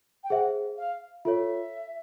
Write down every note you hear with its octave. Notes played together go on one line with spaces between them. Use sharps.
G5
G#4 C5 E5 F#5
F5
F4 A4 C#5 E5